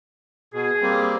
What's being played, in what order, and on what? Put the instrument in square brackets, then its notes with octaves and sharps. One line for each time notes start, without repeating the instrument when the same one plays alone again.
[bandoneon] B2 [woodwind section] G#4
[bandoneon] G3 A#3 C4